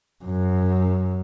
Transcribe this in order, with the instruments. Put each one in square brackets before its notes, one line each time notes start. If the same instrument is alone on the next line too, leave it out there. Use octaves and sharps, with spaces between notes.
[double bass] F#2